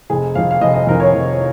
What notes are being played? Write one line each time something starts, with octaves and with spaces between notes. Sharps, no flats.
F1 G#4
F2 D#3 F5
F5
F1 D#5
D#5
F2 D#3 A#4
C#5
F1